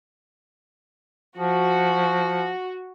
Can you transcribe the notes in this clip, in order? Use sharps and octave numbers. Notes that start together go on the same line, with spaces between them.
F3 F#4